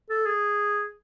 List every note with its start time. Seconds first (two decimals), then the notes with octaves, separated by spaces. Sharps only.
0.10 A4
0.26 G#4